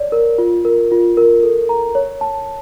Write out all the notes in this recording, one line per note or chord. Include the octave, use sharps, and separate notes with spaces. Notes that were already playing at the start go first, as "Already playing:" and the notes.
Already playing: C#5 D5
A#4
F4
A#4
F4
A#4
A4
A#5
C#5
A5